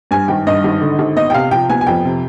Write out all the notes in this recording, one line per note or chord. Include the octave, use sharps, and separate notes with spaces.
G2 G#5
G#1 G5
G2 D#5
G#1
D3
G#1
B3 D#5
G5
C3 F5
F3 G5
B3 G#5
G#5
F2 G5
C3